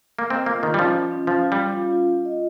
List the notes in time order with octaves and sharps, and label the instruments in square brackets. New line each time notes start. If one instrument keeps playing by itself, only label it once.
[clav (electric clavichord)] A#3
[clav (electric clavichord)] C4 [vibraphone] D#5
[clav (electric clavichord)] A#3 [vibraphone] F4
[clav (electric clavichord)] D#3 [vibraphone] F4
[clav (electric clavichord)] G3
[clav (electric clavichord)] F3 [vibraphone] C#4
[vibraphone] F4
C#4
[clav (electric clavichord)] F3 [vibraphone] F5
[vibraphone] F4
[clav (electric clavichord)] G3
[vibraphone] F4
F4
F4
F4
D#5